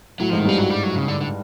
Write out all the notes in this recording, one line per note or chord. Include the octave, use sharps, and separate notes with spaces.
A2 F#3
G#2 F3
D#3
G2 F3
F#3
G3
F#3
C#3
D3
D3